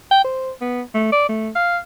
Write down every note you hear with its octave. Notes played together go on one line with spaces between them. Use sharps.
G5
C5
B3
A3
D5
A3
F5